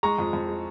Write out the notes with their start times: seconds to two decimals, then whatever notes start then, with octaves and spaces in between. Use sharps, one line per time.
0.03 G#3 A#5 C#6
0.19 F2
0.33 F2
0.48 G#3